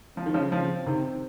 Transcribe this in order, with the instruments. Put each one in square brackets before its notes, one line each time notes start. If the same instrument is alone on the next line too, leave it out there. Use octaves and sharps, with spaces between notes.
[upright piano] F3 [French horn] C4
[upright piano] D#3
C#3 F3
C#3 F3
C3 D#3